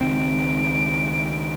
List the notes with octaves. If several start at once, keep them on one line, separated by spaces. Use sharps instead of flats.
C#2 D#3 C4 D7